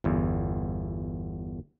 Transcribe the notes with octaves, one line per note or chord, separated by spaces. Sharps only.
G1 E2